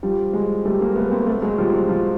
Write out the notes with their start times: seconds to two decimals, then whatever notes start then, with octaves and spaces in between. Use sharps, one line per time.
0.03 F3 G3
0.33 F#3 G#3
0.65 G3 A3
0.81 G#3 A#3
0.96 A3 B3
1.11 A#3 C4
1.22 A#3
1.26 A3 B3
1.42 F#3 G#3
1.58 F3 G3
1.73 F#3
1.89 F3